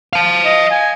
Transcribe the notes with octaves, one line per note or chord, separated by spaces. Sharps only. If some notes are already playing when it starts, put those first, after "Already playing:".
F5 A5
D#5
G#5